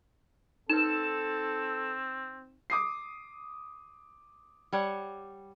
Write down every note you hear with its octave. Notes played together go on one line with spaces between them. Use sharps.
C4 D#4 A4 B4 E7
D6 D#6 C7
G3 C#5 F#5